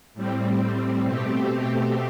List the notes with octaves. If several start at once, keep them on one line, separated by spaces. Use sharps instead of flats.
A2 G3 C4
B2 A3 C4 G4